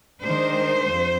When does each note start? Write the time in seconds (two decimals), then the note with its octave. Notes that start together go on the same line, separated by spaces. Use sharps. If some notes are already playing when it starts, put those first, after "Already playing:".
0.21 D#3 G#3 D4 C5
0.88 F2